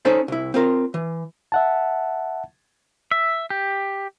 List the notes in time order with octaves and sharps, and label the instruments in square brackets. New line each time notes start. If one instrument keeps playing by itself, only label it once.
[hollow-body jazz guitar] C#4 D#4 A4 C5 D5
C2 E4
C4 F4 A#4
E3
[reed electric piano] E5 F#5 A5
[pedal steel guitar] E5
G4